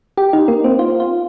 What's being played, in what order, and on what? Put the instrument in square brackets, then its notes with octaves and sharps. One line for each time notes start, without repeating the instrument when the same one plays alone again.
[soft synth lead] G4
D#4
A#3
C4
F4
F4